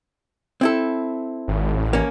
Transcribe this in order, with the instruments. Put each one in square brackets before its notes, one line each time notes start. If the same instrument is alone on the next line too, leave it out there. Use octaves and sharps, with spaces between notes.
[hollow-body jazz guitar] C4 E4 A4
[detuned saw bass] G#1
A1
[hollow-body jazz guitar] A#3 C#4